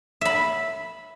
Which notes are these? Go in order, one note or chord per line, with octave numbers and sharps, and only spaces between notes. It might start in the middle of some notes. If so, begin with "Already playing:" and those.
E5 B5